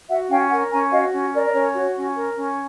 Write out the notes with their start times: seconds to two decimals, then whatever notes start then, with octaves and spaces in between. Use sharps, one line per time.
0.09 F#4 E5 F#5
0.30 C#4 F5 G5
0.50 A#4 F#5 G#5
0.71 C#4 G#5 A#5
0.91 F#4 D#5 F5
1.13 C#4
1.33 A#4 D5
1.46 D5
1.54 C#4 C#5
1.74 F#4
1.95 C#4
2.15 A#4
2.36 C#4